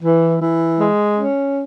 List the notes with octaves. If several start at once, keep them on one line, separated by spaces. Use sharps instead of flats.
E3
E3
G#3
C#4